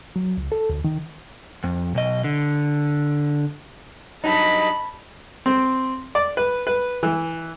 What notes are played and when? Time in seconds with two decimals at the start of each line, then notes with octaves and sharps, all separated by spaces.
0.16 F#3
0.38 C#2
0.52 A4
0.70 D2
0.85 D#3
1.64 F2
1.95 B1 D#5
2.24 D3
4.24 G2 F#3 D#4 A5 B5
5.46 C4
6.15 D5
6.37 B4
6.67 B4
7.03 E3